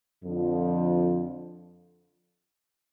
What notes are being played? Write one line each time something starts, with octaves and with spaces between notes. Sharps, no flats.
F2 D3 F3